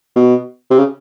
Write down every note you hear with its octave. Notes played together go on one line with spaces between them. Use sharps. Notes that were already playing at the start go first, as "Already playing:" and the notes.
B2
C3
C#3